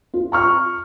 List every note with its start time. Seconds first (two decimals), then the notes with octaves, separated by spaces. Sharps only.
0.14 F4
0.32 A#5 C#6 F6